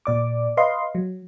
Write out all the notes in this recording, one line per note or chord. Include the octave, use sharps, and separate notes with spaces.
A#2 D5 D6
B4 D#5 F5 C6
F#3